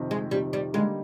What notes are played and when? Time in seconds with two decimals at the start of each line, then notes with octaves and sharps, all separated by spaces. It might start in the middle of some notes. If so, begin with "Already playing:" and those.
Already playing: F2 C3 D#3
0.11 G#3
0.31 F2 C3 D#3 G3
0.53 G3
0.73 D3 G3 G#3 A#3 D#4